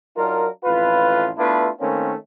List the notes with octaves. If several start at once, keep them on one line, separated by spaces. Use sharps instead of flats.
F#3 D4 D#4 F4 A#4
A1 F2 F4 B4
A3 B3 D4 E4 F4 B4
D#3 A3 A#3 C4 C#4